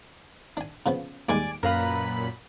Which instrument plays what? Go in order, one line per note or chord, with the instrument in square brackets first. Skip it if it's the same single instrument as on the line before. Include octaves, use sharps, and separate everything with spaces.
[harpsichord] D4 G#5
C#3 F3 B3
[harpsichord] D#2 G3 G#3 [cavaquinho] D5 G#5 [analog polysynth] D7
[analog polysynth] F#2 A#2 B5 [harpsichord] A#4 [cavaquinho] B4 F5 A#5